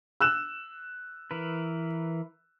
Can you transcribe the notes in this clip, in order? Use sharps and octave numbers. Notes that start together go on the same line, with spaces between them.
E6 F#6 E7
E3 A#4 B4